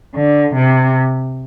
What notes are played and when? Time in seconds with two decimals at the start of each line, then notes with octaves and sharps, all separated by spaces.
0.16 D3
0.55 C3